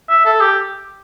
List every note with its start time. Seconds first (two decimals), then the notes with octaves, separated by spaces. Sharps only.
0.09 E5
0.25 A4
0.41 G4